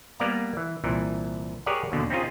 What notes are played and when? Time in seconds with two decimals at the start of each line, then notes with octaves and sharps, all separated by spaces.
0.19 G3 A#3 B3 D5 F5 A#5
0.57 E3
0.84 C2 A#2 E3
1.66 G4 G#4 A#4 C#5 D5 F#5
1.92 D#2 B2 D3
2.10 C4 C#4 D#4 F4 G#4